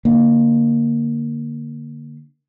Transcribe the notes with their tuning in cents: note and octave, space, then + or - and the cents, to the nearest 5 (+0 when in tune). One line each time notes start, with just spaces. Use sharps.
D3 +0 A#3 +0